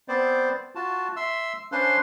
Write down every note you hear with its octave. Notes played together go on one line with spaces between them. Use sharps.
B3 C4 C5 D5
F4 F#4 A5
E5 C6 E6
C#4 D4 B4 C5 F5 C6